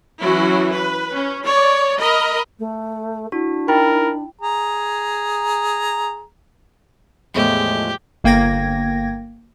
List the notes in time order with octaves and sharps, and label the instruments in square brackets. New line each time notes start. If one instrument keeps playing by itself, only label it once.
[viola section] E3 F#3 C#4 E4 F#4
B4
C#4
C#5 D5
A#4 D#5 B5
[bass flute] A3
[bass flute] D4 [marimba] E4 [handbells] F#4
[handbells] D#4 E4 B5 [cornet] A#4 [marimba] G5
[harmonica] G#4 A#5
[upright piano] E2 A2 [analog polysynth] F3 G#3 A3 [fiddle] G4
[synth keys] G1 A#3 G5 G#6 A#6